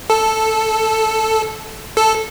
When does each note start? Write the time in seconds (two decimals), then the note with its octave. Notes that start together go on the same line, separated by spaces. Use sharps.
0.10 A4
1.97 A4